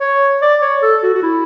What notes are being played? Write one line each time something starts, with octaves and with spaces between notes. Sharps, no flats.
C#5
D5
C#5
A4
F#4
F#4
E4